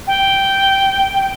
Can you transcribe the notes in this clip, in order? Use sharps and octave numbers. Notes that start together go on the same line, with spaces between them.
G5